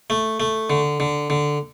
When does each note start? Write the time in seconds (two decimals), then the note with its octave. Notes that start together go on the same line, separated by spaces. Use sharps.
0.10 A3
0.40 A3
0.70 D3
1.00 D3
1.30 D3